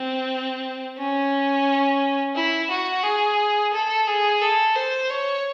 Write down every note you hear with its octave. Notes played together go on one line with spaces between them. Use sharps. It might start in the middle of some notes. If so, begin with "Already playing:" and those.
Already playing: C4
C#4
E4
F#4
G#4
A4
G#4
A4
C5
C#5